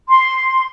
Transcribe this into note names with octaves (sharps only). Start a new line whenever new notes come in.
C6